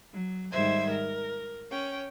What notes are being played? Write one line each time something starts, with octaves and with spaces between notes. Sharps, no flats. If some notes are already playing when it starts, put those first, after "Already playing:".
F#3
G#2 D#3 G3 C5 E5 G#6
A#4
C#4 C#5 G5